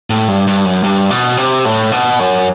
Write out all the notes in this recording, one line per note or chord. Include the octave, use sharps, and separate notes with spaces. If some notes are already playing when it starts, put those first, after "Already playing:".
A2
G2
G2
F#2
G2
B2
C3
A2
B2
F#2